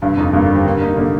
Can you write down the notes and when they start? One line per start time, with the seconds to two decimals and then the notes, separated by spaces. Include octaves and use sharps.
0.02 G2 D3
0.17 F2 D#4
0.33 G2 A#3
0.44 D3
0.49 G3
0.55 C4
0.65 D3 A#3
0.80 A#3 D#4
0.96 D3 A#3